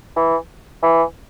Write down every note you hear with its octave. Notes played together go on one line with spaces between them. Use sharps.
E3
E3